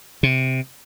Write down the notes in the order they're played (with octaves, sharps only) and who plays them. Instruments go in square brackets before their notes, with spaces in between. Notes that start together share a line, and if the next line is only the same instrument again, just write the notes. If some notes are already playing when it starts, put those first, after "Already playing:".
[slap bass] C3